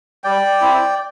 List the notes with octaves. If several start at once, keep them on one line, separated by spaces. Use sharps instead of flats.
G3 D5 G5
C4 E4